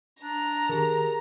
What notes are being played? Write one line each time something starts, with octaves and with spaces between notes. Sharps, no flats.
D4 A#5
D#3 G4 G#4 A#4